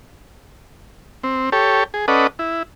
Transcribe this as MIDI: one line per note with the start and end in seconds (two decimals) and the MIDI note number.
1.24 1.50 60
1.52 1.84 67
1.52 1.84 69
1.52 1.84 73
1.94 2.06 68
2.08 2.27 61
2.08 2.27 69
2.08 2.27 71
2.08 2.27 74
2.08 2.27 75
2.08 2.27 78
2.39 2.63 64